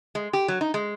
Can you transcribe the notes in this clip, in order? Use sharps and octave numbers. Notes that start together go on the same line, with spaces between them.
G#3
G4
F#3
D#4
G#3